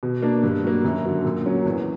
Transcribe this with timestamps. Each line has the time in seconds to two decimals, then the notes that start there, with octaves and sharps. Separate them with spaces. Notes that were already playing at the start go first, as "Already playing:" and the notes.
0.03 B2
0.22 A#3 D4
0.43 G2
0.64 F#3 A#3
0.84 F#2
1.05 D3 F#3
1.25 A#2
1.45 F#3 C#4
1.66 E2